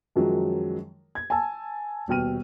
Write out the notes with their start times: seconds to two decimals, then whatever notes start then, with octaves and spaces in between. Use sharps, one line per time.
0.16 F#2 D#3 F3 F#3 G#3
1.15 G#6
1.30 G#5 A5 E6
2.08 D#1 B2 G5 F6 D#7